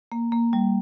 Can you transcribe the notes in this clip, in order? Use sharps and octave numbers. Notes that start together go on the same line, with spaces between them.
A#3
A#3
G3